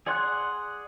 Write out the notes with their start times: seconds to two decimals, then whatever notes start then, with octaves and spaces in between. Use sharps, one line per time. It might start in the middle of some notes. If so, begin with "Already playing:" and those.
0.07 G#4 D5 F#5 C6 F#6